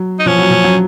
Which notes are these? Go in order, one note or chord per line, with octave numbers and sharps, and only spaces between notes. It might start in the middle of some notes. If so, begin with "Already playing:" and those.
Already playing: F#3
D#4
F3 C#4
F#3
F3
F#3